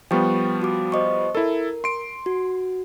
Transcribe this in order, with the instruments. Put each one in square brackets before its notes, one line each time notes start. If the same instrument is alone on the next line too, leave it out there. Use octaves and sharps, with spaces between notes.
[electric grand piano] F3 G3 B3 [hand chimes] G5 C#6
[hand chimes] F#4 D6
C5 D#5 C#6
[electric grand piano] E4 A4 [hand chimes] A#4
[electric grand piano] C6 D7
[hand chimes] F#4